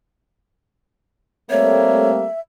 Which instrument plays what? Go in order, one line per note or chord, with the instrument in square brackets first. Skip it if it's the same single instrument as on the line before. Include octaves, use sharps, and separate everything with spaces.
[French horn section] G3 A3 C4 [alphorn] A#3 [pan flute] C#5 [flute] E5